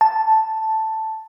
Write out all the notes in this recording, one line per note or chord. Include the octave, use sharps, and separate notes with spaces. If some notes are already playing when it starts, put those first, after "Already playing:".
A5